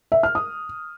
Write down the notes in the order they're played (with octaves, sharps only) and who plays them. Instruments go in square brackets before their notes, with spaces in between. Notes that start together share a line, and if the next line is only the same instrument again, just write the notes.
[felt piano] E5
F6
D#6